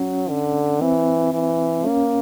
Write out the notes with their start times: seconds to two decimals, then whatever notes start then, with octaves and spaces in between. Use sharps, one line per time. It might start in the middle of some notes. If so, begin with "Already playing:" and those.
Already playing: F#3 C#4
0.29 D3
0.81 E3 C4
1.33 E3
1.87 A#3 C#4